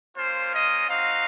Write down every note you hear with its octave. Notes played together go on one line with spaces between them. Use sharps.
A#3 C#4 F4 C5
D#5
C4 D#4 F#4 F5